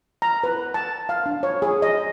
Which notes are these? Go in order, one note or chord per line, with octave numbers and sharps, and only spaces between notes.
A#5
B4
A5
F5
D4
C#5
G#4
D#5